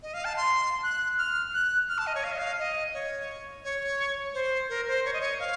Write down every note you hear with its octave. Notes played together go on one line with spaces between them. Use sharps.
D#5
F5
A5
C6
F#6
F6
F#6
F6
A5
D#5
C#5
F5
D#5
F5
D#5
C#5
C#5
C5
A#4
C5
C#5
D#5
C#5
F5